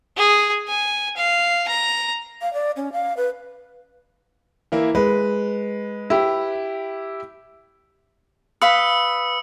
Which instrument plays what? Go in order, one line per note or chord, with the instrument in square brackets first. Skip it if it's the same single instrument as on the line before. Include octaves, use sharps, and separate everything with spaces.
[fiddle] G#4
G#5
F5
A#5
[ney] F5
D5
C#4
F5
B4
[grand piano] E3 A#3 E4
[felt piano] G#3 [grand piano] B4
[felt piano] E4 G4
[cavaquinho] B4 F5 B5 [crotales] D#6 E6 C#7